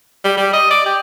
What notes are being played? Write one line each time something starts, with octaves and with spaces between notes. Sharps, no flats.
G3
G3
D#5
D5
G4